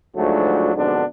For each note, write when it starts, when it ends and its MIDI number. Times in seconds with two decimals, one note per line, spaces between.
0.17 0.70 38
0.17 0.70 44
0.17 0.70 53
0.17 0.70 54
0.17 0.70 57
0.17 0.70 62
0.74 1.03 41
0.74 1.03 44
0.74 1.03 47
0.74 1.03 50
0.74 1.03 54
0.74 1.03 62